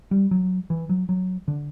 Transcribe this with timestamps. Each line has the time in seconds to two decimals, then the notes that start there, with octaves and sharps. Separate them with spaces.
0.11 G3
0.31 F#3
0.70 E3
0.89 F#3
1.09 F#3
1.48 D3